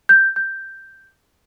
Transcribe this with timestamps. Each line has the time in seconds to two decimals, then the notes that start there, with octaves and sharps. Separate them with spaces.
0.09 G6
0.36 G6